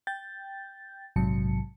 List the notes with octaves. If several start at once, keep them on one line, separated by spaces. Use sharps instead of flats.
G5 G6 A6
A#1 G#2 C3 F#3 A5 C#7